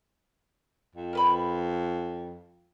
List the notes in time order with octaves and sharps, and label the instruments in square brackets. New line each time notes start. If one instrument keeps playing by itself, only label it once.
[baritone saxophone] F2
[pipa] A#4 B4 B5